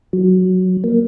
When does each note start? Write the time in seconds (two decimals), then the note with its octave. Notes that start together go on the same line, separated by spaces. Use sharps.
0.13 F#3
0.84 A#3